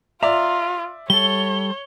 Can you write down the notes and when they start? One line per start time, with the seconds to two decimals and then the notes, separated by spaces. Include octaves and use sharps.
0.23 F4 D5 E5 A#5
1.10 G3 A4 C#5 G7